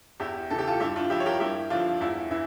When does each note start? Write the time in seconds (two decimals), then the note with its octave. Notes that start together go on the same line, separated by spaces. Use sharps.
0.20 E2 E4 G4
0.50 C#3 E3 A4
0.58 G4
0.67 F4 A4
0.80 G2 E4 G4
0.96 D4 F4
1.10 F3 E4 G4
1.20 C#5
1.26 G4 A#4
1.40 G2 E4 G4
1.70 D3 F3 D4 F4
2.01 E2 E4
2.31 E3 E4